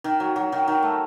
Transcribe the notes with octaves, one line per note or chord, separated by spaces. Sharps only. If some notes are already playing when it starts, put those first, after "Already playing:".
D#3
F#3
F#3
D#3
D#3
A3